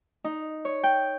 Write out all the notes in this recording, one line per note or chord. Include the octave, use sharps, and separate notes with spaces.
D#4
C#5
G5